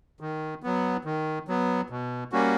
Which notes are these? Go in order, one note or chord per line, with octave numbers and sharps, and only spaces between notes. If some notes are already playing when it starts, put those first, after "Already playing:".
D#3
F#3 B3
D#3
F#3 B3
B2
G3 A#3 C#4 F#4